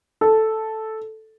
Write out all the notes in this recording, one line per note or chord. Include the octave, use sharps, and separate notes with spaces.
A4